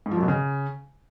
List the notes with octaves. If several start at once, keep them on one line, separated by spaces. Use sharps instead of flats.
G#2
F3
F#2
B2
C#3